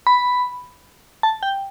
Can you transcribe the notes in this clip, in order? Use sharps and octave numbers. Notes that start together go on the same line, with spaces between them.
B5
A5
G5